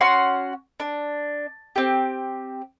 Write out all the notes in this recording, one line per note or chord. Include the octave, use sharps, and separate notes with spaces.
C#4 F#4 F#5 C6
D4
C4 G4